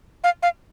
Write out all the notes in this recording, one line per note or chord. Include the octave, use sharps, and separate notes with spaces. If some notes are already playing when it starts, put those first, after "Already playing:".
F5
F5